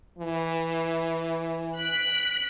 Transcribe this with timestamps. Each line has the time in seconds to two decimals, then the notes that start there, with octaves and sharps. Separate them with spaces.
0.18 E3
1.76 F#6 B6 D7